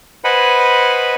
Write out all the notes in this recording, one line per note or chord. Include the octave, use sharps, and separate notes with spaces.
B4 C5 D#5 F#5 G#5 B5